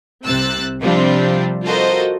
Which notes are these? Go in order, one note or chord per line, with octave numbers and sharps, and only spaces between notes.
C2 C3 C4 E6 F#6 A6
C3 F3 G3 C4 D4 F4
F4 F#4 A4 A#4 C5 D#5